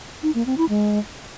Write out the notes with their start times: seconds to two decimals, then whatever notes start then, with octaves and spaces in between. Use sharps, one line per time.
0.23 D#4
0.35 A#3
0.46 C4
0.58 E4
0.69 G#3